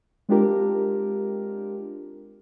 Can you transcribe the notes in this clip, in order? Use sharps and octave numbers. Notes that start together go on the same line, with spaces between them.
G#3 C4 D4 F4 G4 A#4